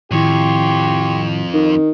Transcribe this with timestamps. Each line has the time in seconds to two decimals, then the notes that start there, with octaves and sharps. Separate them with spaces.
0.11 F2 A2 D#3 E4 G4 C#5 C6
1.53 D#3